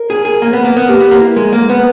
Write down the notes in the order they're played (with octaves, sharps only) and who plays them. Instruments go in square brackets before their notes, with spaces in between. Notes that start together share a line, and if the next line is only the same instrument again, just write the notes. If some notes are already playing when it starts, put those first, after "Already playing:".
Already playing: [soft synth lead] A#4
[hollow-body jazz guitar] G#4
G#4
A#3
B3
A#3
B3
[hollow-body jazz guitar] A#3 [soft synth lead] G4
[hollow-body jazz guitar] B3 [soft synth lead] G4
[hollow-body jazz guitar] A#3
[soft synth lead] E4
[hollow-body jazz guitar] G#3 [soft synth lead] G#4
[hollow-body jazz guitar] A#3 [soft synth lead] A#4
[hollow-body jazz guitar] B3 [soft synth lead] B4